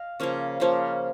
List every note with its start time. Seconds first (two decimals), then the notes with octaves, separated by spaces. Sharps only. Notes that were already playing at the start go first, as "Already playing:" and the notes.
Already playing: D#5 F5
0.20 C#3 F3 A#3 C#4
0.60 C#3 F3 A#3 C#4